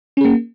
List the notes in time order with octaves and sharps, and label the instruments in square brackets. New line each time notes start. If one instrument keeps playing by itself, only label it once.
[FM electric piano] C#4
G#4
A#3